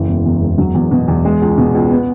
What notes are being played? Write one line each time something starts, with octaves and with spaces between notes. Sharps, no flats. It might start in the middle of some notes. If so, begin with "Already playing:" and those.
Already playing: F#1 E3
E1
E2
E1
F#3
E2
B2
E2
G#3
C#2
B2
C#2
B3